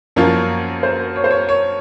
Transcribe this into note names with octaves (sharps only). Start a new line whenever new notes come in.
F#2 F3 A#3 C#4 F4 A#4
C5
C#5
C5
C#5
C#5